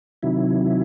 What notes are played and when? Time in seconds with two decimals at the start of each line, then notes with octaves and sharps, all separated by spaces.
0.23 C3 D#3 F#3 E4